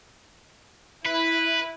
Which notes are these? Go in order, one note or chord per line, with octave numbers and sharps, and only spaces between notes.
E4 B4